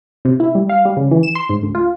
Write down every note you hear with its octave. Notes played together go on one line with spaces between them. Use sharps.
C3
E4
G3
F5
G3
C#3
E3
E7
C6
G#2
D2
F4